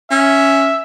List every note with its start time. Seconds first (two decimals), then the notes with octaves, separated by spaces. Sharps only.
0.11 C#4 E5